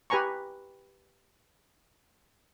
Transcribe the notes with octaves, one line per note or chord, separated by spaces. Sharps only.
G4 B4 G#5 A#5 C#6